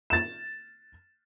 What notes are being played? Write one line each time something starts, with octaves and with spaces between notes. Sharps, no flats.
A6 E7